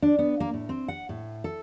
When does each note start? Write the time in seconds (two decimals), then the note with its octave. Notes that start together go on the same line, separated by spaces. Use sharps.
0.02 D4
0.19 B3
0.40 A#3
0.54 A2
0.69 C4
0.88 F#5
1.09 A2
1.44 A4